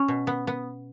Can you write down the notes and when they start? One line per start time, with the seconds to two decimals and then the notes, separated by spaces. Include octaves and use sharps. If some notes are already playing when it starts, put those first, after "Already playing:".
Already playing: C#4
0.08 B2
0.27 B3
0.47 B3